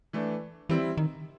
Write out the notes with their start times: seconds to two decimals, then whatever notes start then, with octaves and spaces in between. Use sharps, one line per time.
0.13 E3 A3 D4
0.69 E3 G3 C4 E4
0.97 D#3